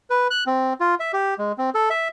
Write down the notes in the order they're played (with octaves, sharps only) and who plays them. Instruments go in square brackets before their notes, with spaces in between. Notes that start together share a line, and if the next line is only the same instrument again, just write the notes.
[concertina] B4
F#6
C4
F4
E5
G4
G#3
C4
A4
E5